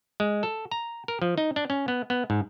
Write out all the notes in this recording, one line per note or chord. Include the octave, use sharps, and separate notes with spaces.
G#3
A4
A#5
A#4
F3
D#4
D4
C#4
B3
B3
G#2